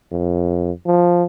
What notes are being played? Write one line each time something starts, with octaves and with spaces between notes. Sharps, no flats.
F2
F3